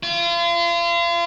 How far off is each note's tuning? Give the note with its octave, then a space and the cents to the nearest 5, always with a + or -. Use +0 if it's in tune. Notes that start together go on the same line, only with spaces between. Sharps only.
F4 -35